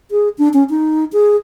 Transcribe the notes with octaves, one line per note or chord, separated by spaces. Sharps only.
G#4
D4
C#4
D#4
G#4